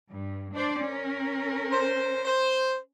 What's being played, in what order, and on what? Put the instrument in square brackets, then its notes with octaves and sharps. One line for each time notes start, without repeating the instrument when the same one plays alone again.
[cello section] G2
D4 C5 D5
C#4 A#4
[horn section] C5
C5